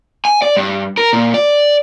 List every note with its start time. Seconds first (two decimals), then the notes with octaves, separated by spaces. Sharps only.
0.25 G#5
0.42 D5
0.57 G2
0.98 A#4
1.13 A#2
1.34 D5